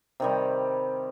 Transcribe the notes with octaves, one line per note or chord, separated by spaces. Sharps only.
C3 D#3 G3